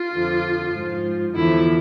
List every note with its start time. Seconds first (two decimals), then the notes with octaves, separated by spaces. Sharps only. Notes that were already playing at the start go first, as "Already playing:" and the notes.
Already playing: F4
0.13 F2 D3 F3
0.74 G#2 F3
1.34 E2 D3 F3 E4